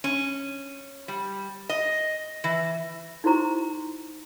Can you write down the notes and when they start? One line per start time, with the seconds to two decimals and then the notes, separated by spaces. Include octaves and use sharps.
0.04 C#4
1.08 G3
1.69 D#5
2.44 E3
3.24 D#4 E4 F#4 C5 A#5 C#6